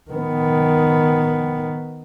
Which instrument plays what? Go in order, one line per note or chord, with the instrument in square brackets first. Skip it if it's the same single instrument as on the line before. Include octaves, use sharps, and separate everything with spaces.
[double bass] D#3 B3